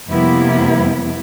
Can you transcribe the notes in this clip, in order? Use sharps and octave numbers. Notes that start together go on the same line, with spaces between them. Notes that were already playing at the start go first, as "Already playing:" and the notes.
F2 C3 G3 A#3 B3 E4